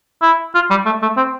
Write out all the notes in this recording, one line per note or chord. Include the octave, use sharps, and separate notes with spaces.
E4
F4
G3
A3
A3
C4